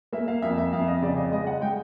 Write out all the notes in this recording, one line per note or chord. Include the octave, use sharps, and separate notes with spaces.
A#3 E5
F5
F2 E5
E5
F2 F5
D#5
C#3 D5
D#5
G#3 D#5
F#5
G#3 G5